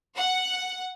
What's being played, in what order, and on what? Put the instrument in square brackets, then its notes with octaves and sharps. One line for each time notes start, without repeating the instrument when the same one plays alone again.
[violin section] F#5